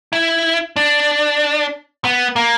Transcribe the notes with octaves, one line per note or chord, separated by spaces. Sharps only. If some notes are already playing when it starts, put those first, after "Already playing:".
E4
D4
B3
A#3